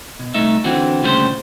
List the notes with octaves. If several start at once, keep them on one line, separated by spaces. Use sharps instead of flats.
B2
C2 A3 D#4 E5
D3 E3 C4 F#4
D2 A#2 C#3 G3 F4 C5